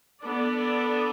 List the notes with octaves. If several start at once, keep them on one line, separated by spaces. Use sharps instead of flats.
B3 D4 A4 D5